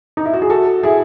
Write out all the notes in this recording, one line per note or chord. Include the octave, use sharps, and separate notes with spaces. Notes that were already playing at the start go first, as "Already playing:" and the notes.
D#4
E4
F#4
G#4
F#4 A4
E4 G#4